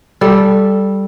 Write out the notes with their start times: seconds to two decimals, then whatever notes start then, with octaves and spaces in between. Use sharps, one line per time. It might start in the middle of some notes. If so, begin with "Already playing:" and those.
0.21 G3 A4